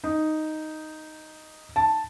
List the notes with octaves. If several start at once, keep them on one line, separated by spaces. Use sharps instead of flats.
D#4
A5